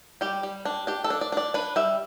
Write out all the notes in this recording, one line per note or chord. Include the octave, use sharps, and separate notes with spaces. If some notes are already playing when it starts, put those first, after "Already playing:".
G3 G4
G3
D4
D4 G4
A4
D4
D5
D4 D5
D4 B4
G3 E5